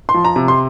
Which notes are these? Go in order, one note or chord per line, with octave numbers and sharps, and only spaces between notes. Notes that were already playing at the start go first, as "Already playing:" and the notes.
C6
F3
A#5
C3
C6